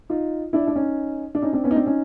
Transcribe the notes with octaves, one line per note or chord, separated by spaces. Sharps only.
D#4 F4
D4 E4
D4
C#4 D#4
D4
C#4 D#4
C4 D4
B3 C#4
D#4
C4 D4
C#4 D#4